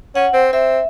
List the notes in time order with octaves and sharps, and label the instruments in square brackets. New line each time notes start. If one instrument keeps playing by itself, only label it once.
[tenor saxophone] C#4 [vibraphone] F#5
[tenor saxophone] C4
[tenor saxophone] C4 [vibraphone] E5